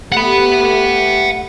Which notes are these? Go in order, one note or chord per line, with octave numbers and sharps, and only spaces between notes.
A3 G4 F#5 B5